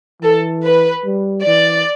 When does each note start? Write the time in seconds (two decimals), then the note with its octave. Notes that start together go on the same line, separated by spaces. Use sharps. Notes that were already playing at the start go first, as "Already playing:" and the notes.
0.21 E3 A4
0.63 B4
1.04 G3
1.46 E3 D5